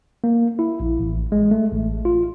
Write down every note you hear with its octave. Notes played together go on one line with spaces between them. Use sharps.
A#3
E4
A#1
A1
G#3
A3
A1
F4